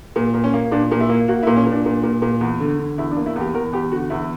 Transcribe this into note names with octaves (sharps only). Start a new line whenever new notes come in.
A#2
A#2
C#4
A#3
A#2 D4
A#2
E4
A#3
A#3 F#4
E4
A#2
C#4
A#2
D4
A#2
A#2
A#2
E2
D3
D3
E2 E4
D4
A#3
E4
E2 G4
E2 A#4
E2 G4
D3 F#4
E2 E4